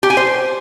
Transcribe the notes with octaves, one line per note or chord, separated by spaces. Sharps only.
G4
G#5
C5